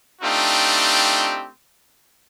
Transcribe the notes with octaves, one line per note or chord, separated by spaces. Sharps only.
A3 C4 D4 D#4 F4 G4